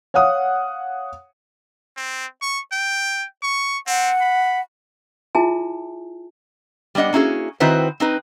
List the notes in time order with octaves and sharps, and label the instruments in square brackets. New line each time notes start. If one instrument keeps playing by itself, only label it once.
[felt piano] C#5 F5 F#5 D#6
[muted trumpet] C4
C#6
G5
C#6
[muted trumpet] C4 [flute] F#5
[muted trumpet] B5
[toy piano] E4 F4 G#4 E5 G#5 A5
[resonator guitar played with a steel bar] G3 B3 D4 D#5 F#5
A#3 C#4 E4 F#4 G#4
D#3 C4 E4 F#4 B4 C5
C4 D#4 B4